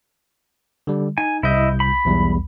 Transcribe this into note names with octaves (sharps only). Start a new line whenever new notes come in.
D3 G3
D#4 G#5
C2 E4 D#5 G6
B5
B1 E2 G3